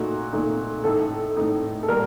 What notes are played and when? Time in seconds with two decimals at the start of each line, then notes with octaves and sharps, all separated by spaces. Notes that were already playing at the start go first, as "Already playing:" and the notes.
Already playing: A#2 A3 D#4 F#4
0.33 A#2 A3 D#4
0.84 A2 A3 D#4 A4
1.37 A2 A3 D#4
1.83 A4
1.88 A#2 G3 A#4